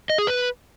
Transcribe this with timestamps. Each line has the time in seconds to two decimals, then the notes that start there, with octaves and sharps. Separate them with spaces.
0.10 D#5
0.18 G#4
0.27 B4